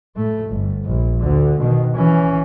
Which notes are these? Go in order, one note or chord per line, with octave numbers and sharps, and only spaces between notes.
A2 A3
G1
A#1
D2 D3
B2 D#3
E3 C#4